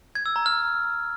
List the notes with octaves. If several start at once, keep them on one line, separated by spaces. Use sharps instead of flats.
G#6
E6
A#5
F6